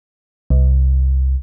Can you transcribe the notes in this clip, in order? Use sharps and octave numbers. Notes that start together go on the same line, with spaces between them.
C2